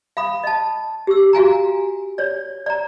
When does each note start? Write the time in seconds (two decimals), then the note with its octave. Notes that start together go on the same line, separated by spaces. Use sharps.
0.17 F5 B5 D#6
0.44 D#5 A5
1.07 G4 E6
1.33 F#4 F5 G#5 A#5
2.18 C#5 D5
2.66 D5 A#5